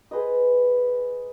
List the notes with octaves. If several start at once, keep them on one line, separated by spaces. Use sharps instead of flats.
G#4 B4 C5 D#5